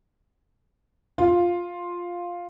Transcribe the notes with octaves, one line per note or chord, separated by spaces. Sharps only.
F4